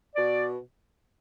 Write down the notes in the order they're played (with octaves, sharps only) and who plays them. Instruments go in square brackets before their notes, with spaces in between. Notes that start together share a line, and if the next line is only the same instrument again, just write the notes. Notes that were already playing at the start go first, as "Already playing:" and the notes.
[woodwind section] B2 D5